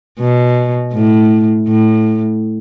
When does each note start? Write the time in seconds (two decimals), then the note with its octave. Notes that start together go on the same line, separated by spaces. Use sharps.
0.20 B2
0.93 A2
1.68 A2